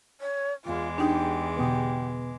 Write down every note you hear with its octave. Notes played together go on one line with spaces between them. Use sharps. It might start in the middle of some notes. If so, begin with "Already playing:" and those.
C#5
E2 G#3 F4 D6
D4 D#4 G4
B2 D3 B3 G4 B4 D#6